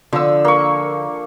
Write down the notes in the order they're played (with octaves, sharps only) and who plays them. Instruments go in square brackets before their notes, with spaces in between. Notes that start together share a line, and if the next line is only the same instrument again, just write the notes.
[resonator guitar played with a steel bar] D3 [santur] F3 E6
[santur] A#3 C#6